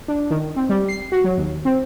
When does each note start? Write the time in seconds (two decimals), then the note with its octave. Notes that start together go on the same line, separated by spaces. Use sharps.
0.08 D4
0.30 D#3
0.56 C4
0.69 G3
0.88 C7
1.12 F#4
1.24 F#3
1.37 D#2
1.65 C4